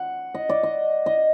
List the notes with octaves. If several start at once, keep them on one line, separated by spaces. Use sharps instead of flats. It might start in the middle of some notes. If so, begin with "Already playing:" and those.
Already playing: F#5
D#5
D5
D#5
D#5